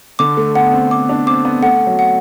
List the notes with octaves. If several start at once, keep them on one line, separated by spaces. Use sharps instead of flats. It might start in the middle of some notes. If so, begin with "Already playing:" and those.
D3 D6
A3
B3 F#5
C4
C4 D6
D4
C4 D6
B3
A3 F#5
F#3
F#5